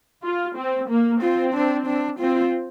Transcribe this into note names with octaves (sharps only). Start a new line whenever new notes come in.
F4
C4
A#3
C4 F4
D4
D4
C4 F4